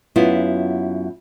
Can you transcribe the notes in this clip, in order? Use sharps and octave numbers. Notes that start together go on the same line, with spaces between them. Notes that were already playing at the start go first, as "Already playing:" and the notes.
F#2 B3 E4 F4